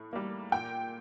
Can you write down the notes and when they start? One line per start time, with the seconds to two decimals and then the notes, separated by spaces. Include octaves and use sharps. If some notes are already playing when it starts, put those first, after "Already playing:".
Already playing: A2
0.13 G3 A#3
0.52 A#2 G5